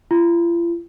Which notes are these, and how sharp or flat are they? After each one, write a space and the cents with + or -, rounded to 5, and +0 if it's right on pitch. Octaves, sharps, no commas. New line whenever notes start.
F4 -45